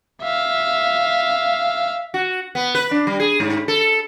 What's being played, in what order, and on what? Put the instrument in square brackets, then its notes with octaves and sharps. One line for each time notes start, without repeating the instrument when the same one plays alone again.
[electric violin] E5 F5
[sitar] F#4
B3
B4
D4
G3
G#4
G#2
A4